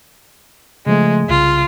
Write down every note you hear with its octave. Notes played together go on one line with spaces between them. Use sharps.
C#3 F3 G#3 A3
C2 C#3 F4